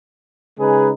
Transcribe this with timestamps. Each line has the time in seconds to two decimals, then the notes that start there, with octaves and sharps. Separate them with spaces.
0.57 C#3 G#3 D#4 G#4 B4